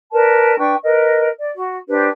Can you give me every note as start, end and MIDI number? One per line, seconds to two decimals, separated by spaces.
0.12 0.56 70
0.12 0.56 71
0.12 0.56 74
0.12 0.56 81
0.58 0.74 62
0.58 0.74 71
0.58 0.74 79
0.58 0.74 85
0.84 1.28 70
0.84 1.28 71
0.84 1.28 75
1.39 1.51 74
1.56 1.77 66
1.88 2.08 62
1.88 2.08 67
1.88 2.08 71
1.88 2.08 72